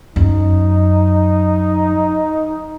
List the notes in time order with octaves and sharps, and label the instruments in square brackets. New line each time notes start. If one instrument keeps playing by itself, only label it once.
[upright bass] F#2 [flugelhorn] D#4